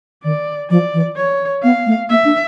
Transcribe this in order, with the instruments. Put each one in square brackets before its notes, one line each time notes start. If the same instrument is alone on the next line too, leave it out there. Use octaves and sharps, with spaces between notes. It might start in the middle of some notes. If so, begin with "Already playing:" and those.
[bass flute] D#3 [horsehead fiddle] D5
[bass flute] F3 [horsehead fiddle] D5
[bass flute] E3
[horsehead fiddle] C#5
[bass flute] B3 [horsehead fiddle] F5
[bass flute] A3
[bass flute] A#3 [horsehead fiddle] E5
[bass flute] D4